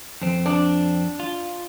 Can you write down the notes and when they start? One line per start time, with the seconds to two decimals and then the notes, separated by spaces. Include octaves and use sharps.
0.21 F2 C4
0.46 D4
1.20 F4